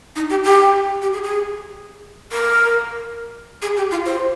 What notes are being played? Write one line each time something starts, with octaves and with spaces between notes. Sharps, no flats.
D#4
G4
G4
G4
G#4
G#4
A#4
G#4
G4
F4
C5